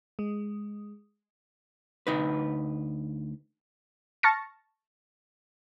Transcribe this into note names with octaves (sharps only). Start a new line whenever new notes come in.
G#3
D2 D#4 B4
A5 C#6 F6 A6 A#6 C#7